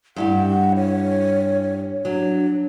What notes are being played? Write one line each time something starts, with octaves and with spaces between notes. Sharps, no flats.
G2 E4 G4 F#5
C#5
F#3 D4